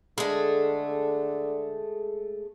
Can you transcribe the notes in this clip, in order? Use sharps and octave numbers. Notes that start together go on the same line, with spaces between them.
D3 G#3 A3